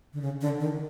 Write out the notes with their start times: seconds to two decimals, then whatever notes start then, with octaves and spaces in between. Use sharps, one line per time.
0.13 D3
0.22 C#3
0.41 D3
0.60 D#3